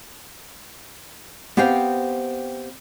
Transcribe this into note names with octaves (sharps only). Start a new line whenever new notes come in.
B3 C4 G4 C5 F5 G5